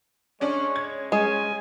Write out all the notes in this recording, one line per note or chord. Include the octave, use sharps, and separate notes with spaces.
G#3 C#4 D4 C#5 D5
G#6
G#3 C#4 G#5